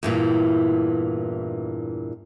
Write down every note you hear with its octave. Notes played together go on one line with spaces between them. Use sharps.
E2 G2 A#2 E3